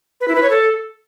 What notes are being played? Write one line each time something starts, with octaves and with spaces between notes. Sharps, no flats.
B4
E4
B4
C#5
A4